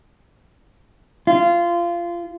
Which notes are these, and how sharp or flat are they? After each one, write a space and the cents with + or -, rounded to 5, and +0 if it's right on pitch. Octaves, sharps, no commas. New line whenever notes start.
F4 -20